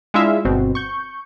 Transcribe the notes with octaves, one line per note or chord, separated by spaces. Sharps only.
G#3 D4 E4 F4 E5 F5
G1 B2 C4
C#6 G6